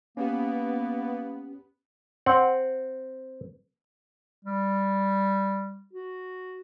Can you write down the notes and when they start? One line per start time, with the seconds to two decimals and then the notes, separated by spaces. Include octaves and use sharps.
0.17 A#3 B3 C#4 G4
2.26 C4 F#5
4.45 G3
5.93 F#4